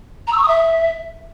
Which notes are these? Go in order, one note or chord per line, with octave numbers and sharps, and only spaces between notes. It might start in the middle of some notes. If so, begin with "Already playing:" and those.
A#5
E6
C#6
D#6
E5